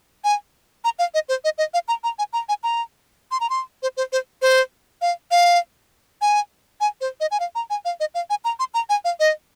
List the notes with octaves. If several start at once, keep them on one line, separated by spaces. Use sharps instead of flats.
G#5
A#5
F5
D#5
C5
D#5
D#5
F5
A#5
A#5
G#5
A#5
G#5
A#5
C6
A#5
C6
C5
C5
C5
C5
F5
F5
G#5
G#5
C5
D#5
G#5
F5
A#5
G#5
F5
D#5
F5
G#5
A#5
C6
A#5
G#5
F5
D#5